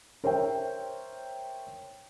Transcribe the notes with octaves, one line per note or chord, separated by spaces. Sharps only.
A#4 C5 C#5 E5 G5